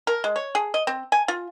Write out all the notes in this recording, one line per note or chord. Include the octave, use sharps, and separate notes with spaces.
A#4
G#3
C#5
G#4
D#5
C4
G#5
F4